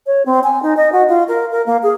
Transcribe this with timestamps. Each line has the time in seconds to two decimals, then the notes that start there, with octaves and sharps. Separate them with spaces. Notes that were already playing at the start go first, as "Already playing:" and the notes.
0.07 C#5
0.26 C4
0.44 G#5
0.62 D#4
0.77 D#5
0.92 F#4
1.08 F4
1.28 A#4
1.51 A#4
1.66 A#3
1.83 G#4